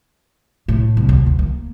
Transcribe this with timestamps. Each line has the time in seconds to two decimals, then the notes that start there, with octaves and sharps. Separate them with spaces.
0.68 A2
0.97 C2
1.09 D2
1.26 D2
1.39 A#3